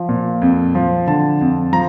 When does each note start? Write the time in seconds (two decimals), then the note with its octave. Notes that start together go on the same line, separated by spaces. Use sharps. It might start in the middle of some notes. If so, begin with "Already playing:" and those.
Already playing: F3
0.09 A#2
0.42 F2
0.75 F3
1.07 D3 A5
1.41 F2
1.73 F3 A#5